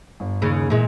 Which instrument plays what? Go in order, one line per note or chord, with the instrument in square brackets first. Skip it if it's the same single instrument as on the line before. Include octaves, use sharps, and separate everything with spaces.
[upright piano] G1
[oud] D#2 C#3
[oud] A#2 G#3 [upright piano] E3